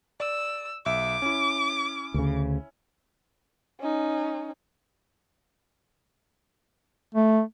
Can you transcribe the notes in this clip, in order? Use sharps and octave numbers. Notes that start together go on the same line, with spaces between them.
D5 E6
B1 E5 D6
C#4 E4
D2 C#3
C#4 D#4
A3